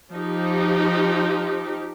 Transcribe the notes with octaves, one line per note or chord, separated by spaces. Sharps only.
F3 D#4 G4